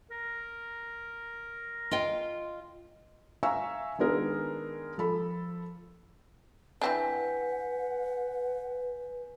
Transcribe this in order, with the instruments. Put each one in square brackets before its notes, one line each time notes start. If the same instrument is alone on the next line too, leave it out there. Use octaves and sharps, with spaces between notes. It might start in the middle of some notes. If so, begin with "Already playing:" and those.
[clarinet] A#4
[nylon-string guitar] F4 D#5 G5
[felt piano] E5 F5 G#5 A#5 C#6 E6
D#3 G#3 B3 D4 G#4 A#4
F3 A4 B5
[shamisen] E3 C4 D4 [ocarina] B4 [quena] F#5 [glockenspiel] G#5 G6 B6